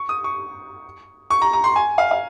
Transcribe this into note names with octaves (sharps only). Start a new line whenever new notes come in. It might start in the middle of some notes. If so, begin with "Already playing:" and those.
Already playing: C#6
D#6
C#6
C#6
A#5
A#5
C6
G#5
F5
F5